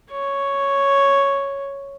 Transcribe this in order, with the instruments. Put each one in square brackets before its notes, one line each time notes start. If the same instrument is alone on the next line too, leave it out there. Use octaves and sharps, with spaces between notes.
[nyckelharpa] C#5